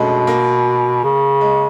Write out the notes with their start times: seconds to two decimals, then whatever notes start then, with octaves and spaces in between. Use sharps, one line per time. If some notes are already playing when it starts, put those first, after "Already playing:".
Already playing: B2 G#3 A3 C#4 D4
0.27 A#3
1.03 C#3
1.41 G#3